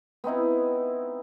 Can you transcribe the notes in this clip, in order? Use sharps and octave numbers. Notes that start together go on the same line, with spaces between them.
B3 C4 D#4 E4